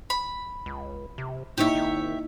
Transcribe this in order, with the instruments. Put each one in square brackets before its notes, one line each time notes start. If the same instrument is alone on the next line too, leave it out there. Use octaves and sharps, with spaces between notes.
[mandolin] B5
[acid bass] C#2
C3
[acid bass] A2 [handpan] A#3 D#4 E4 [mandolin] G4 C#5 E5
[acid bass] G#1